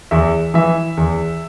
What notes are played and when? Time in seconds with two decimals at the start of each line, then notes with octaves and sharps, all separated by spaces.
0.11 E2 E5
0.54 E3 E5
0.97 E2